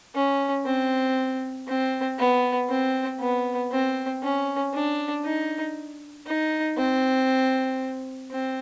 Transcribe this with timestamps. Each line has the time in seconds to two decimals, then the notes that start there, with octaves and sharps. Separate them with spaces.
0.15 C#4
0.65 C4
1.67 C4
2.18 B3
2.69 C4
3.20 B3
3.72 C4
4.22 C#4
4.74 D4
5.25 D#4
6.26 D#4
6.78 C4
8.31 C4